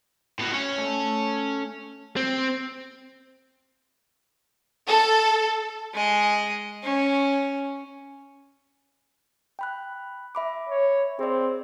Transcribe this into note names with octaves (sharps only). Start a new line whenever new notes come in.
A2 B3 F#4
C#4 C#5
A3
C4
A4
G#3 D#5
C#4
G5 B5 F#6
E5 B5 D6
C#5
C4 G#4 D5